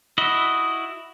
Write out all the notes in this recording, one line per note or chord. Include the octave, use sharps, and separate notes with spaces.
E4 F#4 D#5